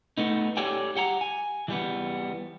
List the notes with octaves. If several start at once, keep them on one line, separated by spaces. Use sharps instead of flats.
A3 B3 D#4
G4 A4 C#5 D5 G5 G#5
G4 F#5 G5 A#5
G#5
E3 G3 B3